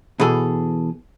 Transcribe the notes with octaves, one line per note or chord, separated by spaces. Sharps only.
B2 E3 G#4 A4